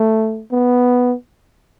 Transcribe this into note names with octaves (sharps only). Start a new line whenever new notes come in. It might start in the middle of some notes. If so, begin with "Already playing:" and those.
Already playing: A3
B3